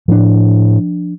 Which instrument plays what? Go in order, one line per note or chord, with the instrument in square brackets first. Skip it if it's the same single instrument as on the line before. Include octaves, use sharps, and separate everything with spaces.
[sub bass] A2 [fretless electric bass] F3 D4